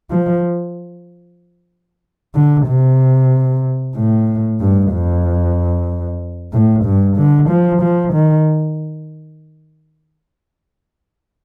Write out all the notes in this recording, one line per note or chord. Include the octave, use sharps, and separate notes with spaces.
F3
D3
C3
A2
G2
F2
A2
G2
D3
F3
F3
D#3